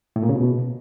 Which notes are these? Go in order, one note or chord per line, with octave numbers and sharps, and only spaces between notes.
A2
A#2
C#3
B2